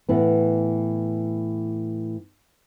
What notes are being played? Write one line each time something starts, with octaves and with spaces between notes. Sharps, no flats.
A2 E3 B3